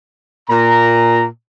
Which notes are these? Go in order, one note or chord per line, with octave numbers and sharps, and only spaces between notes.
A#2 A#5